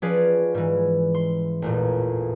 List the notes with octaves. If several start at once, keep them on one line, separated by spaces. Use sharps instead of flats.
F3 C#4 G#4 B4 D5 F5
G#2 E3
C6
A1 E2 A#2